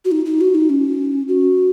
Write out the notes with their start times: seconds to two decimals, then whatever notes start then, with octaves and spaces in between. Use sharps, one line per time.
0.05 F#4
0.11 D#4
0.25 D#4
0.41 F#4
0.55 D#4
0.70 C#4
1.28 F#4